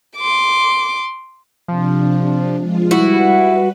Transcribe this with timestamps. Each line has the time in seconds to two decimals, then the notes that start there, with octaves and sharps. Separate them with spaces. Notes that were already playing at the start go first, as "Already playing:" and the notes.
0.17 C6 D6
1.68 C3 F3 D4
2.58 F3 G#3 F4
2.91 G3 E4 F#4 B4